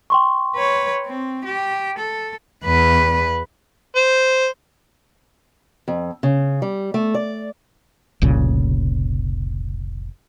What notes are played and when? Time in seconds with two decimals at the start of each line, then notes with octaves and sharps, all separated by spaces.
0.10 G5 C6 C#6
0.56 B4 C#5
1.06 C4
1.44 G4
1.98 A4
2.65 E2 B4
3.96 C5
5.88 F2
6.23 C#3
6.62 G3
6.94 A3
7.14 D5
8.22 F1 C2 A#2 C#3